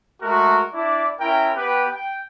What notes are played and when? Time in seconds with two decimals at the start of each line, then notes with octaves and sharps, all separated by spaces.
0.21 G#3 A3 F#4 A#4
0.74 D4 E4 D5
1.20 C#4 E4 A#4 G5
1.56 B3 G4 B4
1.89 G5